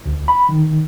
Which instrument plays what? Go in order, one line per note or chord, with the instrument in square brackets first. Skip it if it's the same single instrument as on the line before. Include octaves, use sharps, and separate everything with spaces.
[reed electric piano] D2
B5
D#3